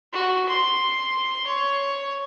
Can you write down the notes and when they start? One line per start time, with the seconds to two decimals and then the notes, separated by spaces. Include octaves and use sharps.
0.13 F#4
0.49 C6
1.47 C#5